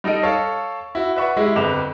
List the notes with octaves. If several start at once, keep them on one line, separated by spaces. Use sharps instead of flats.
G3 D#4 A4 D#5 D7
A4 C#5 F5 A5
E4 F#4
B4 D5 E5 F#5 B5 C#6
G#3 E4 G4 G#4
G1 F2 B4 D6 E7 F7